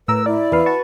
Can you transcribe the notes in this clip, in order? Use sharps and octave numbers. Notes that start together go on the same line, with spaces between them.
A2 A#4 B4 E6
E4 D5
E2 B4 F5
F#4 A5 C#6